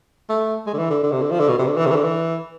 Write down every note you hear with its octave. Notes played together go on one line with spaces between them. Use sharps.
A3
G#3
D3
E3
D3
D3
C3
D3
F3
D3
B2
C3
D3
E3
C3
E3
D3
E3